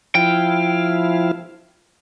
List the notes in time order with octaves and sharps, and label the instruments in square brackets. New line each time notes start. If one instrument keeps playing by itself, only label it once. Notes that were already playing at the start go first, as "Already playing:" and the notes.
[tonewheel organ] F3 E4 F5 [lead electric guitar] G5